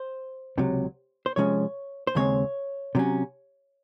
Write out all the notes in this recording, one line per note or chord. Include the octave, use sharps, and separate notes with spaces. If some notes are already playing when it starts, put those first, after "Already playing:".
Already playing: C5
C#2 C3 F#3
C5
C3 F3 G#3 C#4 C#5
C5
D#2 C#3 G#3 C4 C#5
C3 F#3 C#4